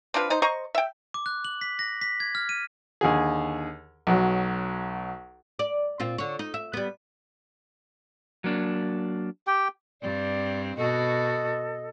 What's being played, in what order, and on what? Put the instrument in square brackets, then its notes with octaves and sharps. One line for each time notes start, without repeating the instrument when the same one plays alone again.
[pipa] C4 D4 F4 B4
D#4 C5
C5 D#5 A#5 C#6
E5 G5
[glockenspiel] D6
F#6
F#7
B6
A#6
B6
G#6
F6
D#7
[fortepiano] D#2 D3 G#4
B1 F#3
[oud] D5
A#2 C4 F4
D3 C#5
D#4
E5
G3 B3
[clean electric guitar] F#3 A#3 D4
[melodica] G4 G5
[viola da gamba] G2 C4 [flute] D5
[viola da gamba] B2 F#4 [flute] A4 [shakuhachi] D#5